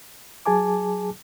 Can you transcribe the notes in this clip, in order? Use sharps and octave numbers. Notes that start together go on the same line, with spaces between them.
F#3 G#4 G#5 A5 D6